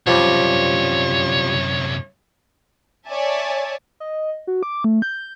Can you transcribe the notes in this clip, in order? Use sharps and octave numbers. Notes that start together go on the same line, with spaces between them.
C2 F#2 F3 G3 C#5
C#5 D5 E5 G#5 A5
D#5
F#4
D6
A3
G6